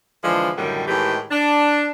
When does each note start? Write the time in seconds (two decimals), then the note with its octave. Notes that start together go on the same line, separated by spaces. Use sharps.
0.23 D3 E3 F3 G#3
0.57 F#2 A2 D3 D#3 G3
0.88 A2 D#3 E3 G#3 G4
1.31 D4